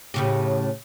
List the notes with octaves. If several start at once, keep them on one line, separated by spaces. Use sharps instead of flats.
A2 C#3 G4